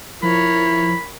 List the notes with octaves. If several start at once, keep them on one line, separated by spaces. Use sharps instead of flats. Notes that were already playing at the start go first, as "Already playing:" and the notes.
F3 E4 A#4 C#5 B5